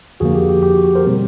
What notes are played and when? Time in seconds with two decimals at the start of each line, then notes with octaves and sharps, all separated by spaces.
0.20 F2 D3 F3 A#3 F#4 G#4
0.35 G4
0.49 G4
0.63 G4
0.74 F#4
0.85 G4
0.95 A#4 C5
1.06 B2 G3 C4